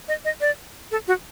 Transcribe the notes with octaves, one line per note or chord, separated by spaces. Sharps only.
D#5
D#5
D5
A4
F#4